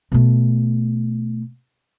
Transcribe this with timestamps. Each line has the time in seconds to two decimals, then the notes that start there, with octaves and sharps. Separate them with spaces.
0.12 B2 A3